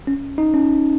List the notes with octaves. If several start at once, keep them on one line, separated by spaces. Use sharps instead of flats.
C#4
D#4
C#4